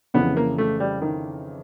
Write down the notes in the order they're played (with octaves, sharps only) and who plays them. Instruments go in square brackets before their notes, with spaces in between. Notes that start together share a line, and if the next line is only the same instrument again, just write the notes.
[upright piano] F2 C#3 E3 [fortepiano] B3
[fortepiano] A#3
A3
G3
D#3